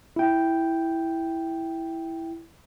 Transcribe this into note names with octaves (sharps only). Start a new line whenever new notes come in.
E4 G5